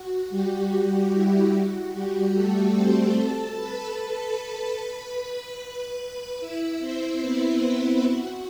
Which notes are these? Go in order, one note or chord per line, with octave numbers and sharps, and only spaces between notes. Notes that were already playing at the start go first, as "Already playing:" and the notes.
Already playing: F#4
G3 G4
F#4
E4
F#4
G3 G4
A3 A4
C4 C5
A4 A5
B4 B5
A4 A5
A4 A5
B4 B5
E4 E5
C4 C5
B3 B4
E4
F#4